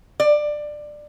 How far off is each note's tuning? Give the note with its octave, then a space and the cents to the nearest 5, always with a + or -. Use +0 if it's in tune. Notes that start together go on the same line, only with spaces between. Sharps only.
D5 +15